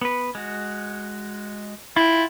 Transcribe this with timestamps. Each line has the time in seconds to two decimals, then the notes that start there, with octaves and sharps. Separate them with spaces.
0.01 B3 B4
0.35 G#3 F#4
1.96 E4 F4 G5